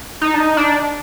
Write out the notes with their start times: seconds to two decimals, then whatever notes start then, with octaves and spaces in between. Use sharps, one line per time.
0.21 D#4
0.34 D4
0.40 D#4
0.57 D4